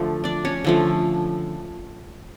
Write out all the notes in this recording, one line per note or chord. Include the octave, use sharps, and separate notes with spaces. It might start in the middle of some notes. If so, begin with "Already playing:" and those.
Already playing: D3 F3 A3
D4 D5
C#4 C#5
D3 F3 A3